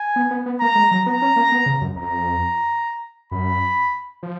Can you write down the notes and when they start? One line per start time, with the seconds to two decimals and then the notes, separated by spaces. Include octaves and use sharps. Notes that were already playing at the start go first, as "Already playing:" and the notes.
Already playing: G#5
0.16 B3
0.31 B3
0.46 B3
0.60 A#3 A#5
0.76 G#3
0.91 F#3
1.06 B3 A#5
1.22 C#4
1.36 A#3
1.52 B3
1.66 C#3
1.81 F#2
1.96 F2 A#5
3.31 F#2 B5
4.23 F3